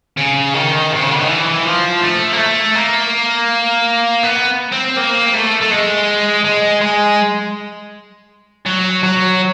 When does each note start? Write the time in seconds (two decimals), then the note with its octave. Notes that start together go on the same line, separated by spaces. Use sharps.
0.17 C#3
0.54 D#3
0.93 C3
1.02 C#3
1.11 D3
1.19 D#3
1.28 E3
1.65 F3
2.02 A3
2.33 A#3
2.39 A3
2.76 A#3
4.23 B3
4.73 C4
4.97 A#3
5.34 A3
5.61 A3
5.71 G#3
6.45 G#3
6.81 G#3
8.66 F#3
9.03 F#3